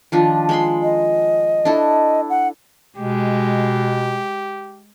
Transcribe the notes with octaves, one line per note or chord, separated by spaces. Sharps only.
D#3 F3 D4
G#3 B5 C6
D#5
D4 E4 A4
F#5
B2 G#3 G4